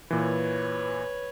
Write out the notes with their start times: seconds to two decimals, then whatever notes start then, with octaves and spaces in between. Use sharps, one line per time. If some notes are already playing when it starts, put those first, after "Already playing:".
0.11 A#2 E3 B4 C#5